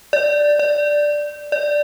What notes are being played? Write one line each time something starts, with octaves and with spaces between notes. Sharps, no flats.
D5
D5
D5